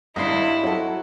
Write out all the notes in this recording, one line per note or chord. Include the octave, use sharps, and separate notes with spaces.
G#1 G2 E4 D#5 F5 C6 C7
F#3 F#4 A4